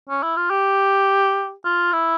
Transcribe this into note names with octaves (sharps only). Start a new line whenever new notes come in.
C#4
E4
F4
G4
F4
E4